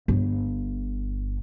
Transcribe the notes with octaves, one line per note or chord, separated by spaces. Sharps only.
G1